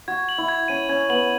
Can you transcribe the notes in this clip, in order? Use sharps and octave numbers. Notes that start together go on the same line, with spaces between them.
F#4 G#6
F#7
E4
G#6
C#4 D#7
C#4 G#6
B3 F#7